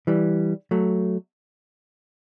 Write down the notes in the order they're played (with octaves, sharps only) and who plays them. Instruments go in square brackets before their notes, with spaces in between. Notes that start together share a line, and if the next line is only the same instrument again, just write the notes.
[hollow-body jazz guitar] E3 G3
F#3 A3